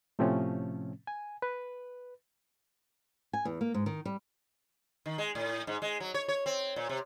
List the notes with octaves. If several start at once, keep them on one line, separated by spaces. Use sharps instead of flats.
A2 C3 F3 A3 C4 C#4
G#5
B4
G#5
E2
A#3
G#2
D#3
G3
D#3
G#3
A2
G#2
G#3
F#3
C#5
C#5
C4
A#2
C3